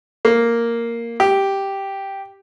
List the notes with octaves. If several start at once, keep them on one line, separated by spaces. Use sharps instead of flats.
A#3
G4